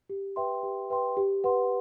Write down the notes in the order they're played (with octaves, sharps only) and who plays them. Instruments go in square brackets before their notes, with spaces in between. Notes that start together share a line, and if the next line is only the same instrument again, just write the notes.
[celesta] G4
B4 E5 G5 C6
G4
B4 E5 G5 C6
G4
B4 F#5 C6